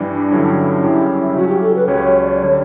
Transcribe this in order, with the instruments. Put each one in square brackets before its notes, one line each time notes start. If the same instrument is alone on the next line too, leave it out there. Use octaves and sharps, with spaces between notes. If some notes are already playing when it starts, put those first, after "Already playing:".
Already playing: [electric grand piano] G2 E3 G3 [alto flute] D4
[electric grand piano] G2 D3 F#3 C#4 G4 [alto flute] E4
[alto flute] D4
[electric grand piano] F#2 C#3 G3 C#4 G4 [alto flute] E4
[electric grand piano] C#3 F#3 C#4 [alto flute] F#4
[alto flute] G4
A4
B4
[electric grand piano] C#2 C#3 F#3 C#4 G4 [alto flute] C#5
[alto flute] C#5
D5
[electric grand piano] D3 G3 [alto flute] C#5